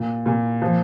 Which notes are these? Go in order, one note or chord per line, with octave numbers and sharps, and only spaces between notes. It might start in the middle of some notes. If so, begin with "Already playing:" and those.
Already playing: A#2
A#2
F3